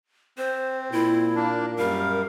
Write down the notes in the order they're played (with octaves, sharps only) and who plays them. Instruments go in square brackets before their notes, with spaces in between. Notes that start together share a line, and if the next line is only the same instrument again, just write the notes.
[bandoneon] C4 [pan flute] C5
[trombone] A#2 [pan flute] E4
[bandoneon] A#3 D4
[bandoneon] F#2 G3 F5 [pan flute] A#4